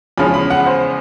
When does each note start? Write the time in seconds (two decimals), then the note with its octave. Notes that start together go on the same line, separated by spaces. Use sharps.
0.18 E2 C#3 F3 G#3 C#4 B5
0.34 B5
0.50 F#5
0.66 C5